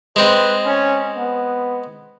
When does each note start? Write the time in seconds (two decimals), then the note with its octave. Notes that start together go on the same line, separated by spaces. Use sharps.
0.16 G#3 C4 B4
0.65 C#4
1.17 B3